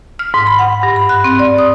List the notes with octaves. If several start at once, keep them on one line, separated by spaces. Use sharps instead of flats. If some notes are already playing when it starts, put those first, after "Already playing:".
F6
G#2
B5
F#5
G2
B5
F#6
C4
D5
D#6